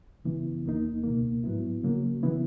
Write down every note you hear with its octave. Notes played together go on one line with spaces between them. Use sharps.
F#2 C#3 E3 B3 E4
D#2 D#3 A#3 D#4
C#2 B2 A#3
G#2 F#3 B3 E4
C#3 F#3 A#3
C#3 E3 B3 E4